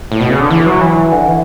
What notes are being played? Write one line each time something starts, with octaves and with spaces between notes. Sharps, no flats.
A2
B2
C#3
D3
E3
F#3
E3
D3
E3